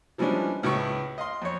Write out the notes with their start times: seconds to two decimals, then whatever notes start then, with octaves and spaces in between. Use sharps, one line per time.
0.18 E3 F3 G3 G#3 C#4 D4
0.63 C#2 A2 B4 C#6
1.18 D#5 F5 C6
1.42 F2 C#5